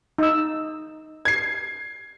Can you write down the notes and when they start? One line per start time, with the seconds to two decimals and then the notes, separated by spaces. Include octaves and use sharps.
0.19 D#4 E6
1.25 G#6 C7